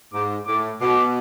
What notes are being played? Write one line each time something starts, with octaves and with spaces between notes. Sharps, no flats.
G#2 D6
A2 D6
B2 D6